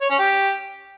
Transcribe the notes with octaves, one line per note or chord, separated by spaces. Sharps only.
C#5
C#4
G4